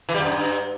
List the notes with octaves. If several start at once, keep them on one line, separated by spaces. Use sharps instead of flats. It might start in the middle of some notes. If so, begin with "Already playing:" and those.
E3
G3
F2
F#2
G2